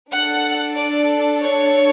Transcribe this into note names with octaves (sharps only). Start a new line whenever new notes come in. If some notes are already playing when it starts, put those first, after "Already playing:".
D4 A4 F#5
D5
C#5